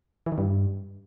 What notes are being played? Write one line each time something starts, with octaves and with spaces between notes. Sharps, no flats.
E3
D#3
G2